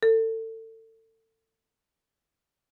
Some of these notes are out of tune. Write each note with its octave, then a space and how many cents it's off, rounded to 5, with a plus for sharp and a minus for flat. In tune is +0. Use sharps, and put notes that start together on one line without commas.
A4 +30